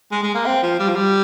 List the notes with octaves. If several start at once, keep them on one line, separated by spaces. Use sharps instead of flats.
G#3
G#3
A#3
C4
F3
G3
F3
G3